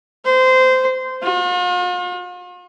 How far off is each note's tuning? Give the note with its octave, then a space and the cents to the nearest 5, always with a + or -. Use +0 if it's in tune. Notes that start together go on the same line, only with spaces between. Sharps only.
C5 -20
F4 +45